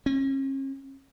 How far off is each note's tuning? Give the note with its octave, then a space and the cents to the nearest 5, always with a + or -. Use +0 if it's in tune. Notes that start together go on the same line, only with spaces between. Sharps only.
C#4 -40